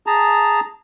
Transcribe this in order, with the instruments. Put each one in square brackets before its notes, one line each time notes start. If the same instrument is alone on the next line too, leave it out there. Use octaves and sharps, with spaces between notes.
[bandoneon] G#4 A5 A#5